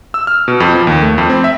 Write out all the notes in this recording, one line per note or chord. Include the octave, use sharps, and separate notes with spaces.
E6
F6
B2
F2
F3
D#2
A3
F2
C4
E5